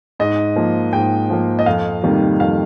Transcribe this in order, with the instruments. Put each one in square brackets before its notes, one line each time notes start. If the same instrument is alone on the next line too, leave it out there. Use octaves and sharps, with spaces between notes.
[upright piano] G#2 D#5
F3 A#3
G#2 G5
F3 A#3
D#5
F2 F5
C3 D#3 G3 A#3
F2 F5